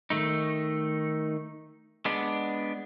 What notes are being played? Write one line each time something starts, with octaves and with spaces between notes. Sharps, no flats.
D#3 A3 D#4
G#3 B3 D4